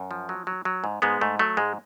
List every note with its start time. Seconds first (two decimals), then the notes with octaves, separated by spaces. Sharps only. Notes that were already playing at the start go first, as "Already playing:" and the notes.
Already playing: F#2
0.11 F3
0.29 F#3
0.47 F#3
0.65 F#3
0.84 G#2
1.02 G#2 G#3 B3
1.21 G#2 A3
1.39 F#3 A3
1.57 G#2 G#3